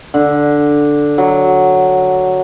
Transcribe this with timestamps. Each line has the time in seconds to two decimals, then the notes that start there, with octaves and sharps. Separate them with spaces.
0.14 D3
1.18 F#3